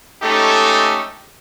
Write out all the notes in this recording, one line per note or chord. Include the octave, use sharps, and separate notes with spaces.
G#3 A3 C#4 D#4 G4 A4